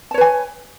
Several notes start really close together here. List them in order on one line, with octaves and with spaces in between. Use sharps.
A5 C#5 B4 G#5